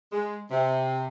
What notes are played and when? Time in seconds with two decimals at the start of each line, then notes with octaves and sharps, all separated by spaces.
0.12 G#3
0.51 C3